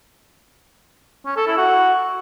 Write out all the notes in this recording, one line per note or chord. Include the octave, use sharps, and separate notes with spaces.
C#4
A4
E4
F#4